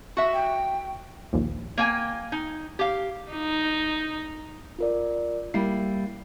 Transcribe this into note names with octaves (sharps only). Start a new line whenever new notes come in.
F#4 E5
G5
A#1 D#2
A#3 G5 G#5
D#4
G4 F5
D#4
F4 A#4 D5
G3 A#3 E4 C7